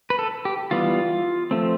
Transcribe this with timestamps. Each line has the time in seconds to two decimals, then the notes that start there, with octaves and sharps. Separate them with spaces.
0.10 B4
0.19 A4
0.45 G4
0.71 E3 G3 B3 F4
1.51 F3 A3 C4